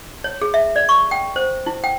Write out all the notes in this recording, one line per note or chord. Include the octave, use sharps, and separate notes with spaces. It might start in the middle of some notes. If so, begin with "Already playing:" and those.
C#5
G#4
E5
D5
C#6
G5
C5
E4
G5